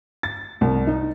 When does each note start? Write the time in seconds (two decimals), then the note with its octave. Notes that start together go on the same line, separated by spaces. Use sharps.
0.23 A6
0.61 C2
0.87 D#4